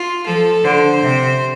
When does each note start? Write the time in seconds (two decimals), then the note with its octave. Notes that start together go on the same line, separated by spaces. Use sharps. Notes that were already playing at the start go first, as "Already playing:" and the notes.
Already playing: F4
0.26 F3 A4
0.64 D3 C5
1.01 C3